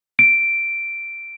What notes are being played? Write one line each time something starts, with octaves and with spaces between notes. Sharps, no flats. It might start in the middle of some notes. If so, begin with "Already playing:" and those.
D7